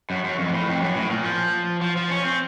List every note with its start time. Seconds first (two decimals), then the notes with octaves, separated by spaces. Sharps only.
0.10 F#2
0.24 F#2
0.39 F2
0.49 A#2
0.53 A2
0.67 F2
0.81 F#2
0.96 A2
1.10 A#2
1.24 F3
1.82 F3
1.97 F3
2.10 C#4
2.24 C4